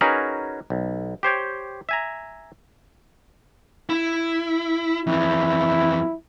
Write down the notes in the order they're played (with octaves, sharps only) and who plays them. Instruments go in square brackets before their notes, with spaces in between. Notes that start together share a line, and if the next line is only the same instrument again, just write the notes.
[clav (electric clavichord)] C#4 D#4 F#4 G#4 A#4 B4
B1
G4 C5 C#5 G5
E5 G#5 A#5
[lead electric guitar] E4
[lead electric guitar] F2 E3 [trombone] E4